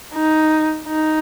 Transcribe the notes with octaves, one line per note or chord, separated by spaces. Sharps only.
D#4
D#4